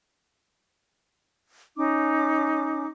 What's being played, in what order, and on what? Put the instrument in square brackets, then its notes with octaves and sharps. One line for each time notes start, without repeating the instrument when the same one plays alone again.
[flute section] C#4 D#4 D6